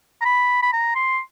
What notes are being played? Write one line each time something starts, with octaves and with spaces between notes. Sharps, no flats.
A#5
B5
B5
A#5
C6